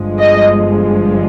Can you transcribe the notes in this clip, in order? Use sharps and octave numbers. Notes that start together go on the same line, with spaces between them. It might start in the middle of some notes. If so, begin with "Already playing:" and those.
Already playing: G1 G2 F3 G#3
D#5